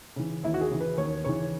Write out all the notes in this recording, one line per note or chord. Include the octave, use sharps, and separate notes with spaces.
C#3 E3
D#2 E4
F#4
G#4
C#3 E3
B4
D#2 C#5
C#3 E3 C#5